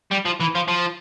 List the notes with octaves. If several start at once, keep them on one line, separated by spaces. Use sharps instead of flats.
G3
F3
E3
F3
F3